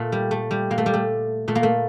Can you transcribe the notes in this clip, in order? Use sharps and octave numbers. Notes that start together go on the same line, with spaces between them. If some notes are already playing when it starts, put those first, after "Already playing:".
Already playing: A#2 A3
G3
A3
G3
A#2 A#3
A3
G3
A3
A#2 A3
A#3
A3